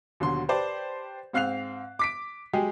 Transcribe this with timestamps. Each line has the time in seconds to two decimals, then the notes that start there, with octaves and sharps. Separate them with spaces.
0.20 D#2 B2 D3 F#3 C6
0.49 G4 B4 C5 D5 A5
1.33 G#2 C4 F5 F#6 C7 F7
1.99 D6 B6 D7
2.53 F#3 G#3 G4 G#4